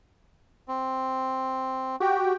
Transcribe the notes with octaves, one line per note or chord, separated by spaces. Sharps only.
C4
F#4 G4 G5